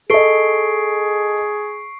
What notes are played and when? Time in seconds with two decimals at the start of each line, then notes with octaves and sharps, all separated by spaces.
0.10 G#4 A4 D#5 C#6 C7 D7